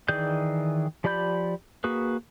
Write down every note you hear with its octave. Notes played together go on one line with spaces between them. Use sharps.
D#3 E3 G#4 D5 G6
F3 G4 D5 B5 G6
A#3 F#4 G#4 B4